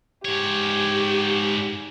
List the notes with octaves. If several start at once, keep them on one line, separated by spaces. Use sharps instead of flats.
G#2 G4 C#5